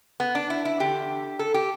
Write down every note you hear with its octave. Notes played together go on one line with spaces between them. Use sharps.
B3
D4
E4
E4
E2 D3 G4
A4
G4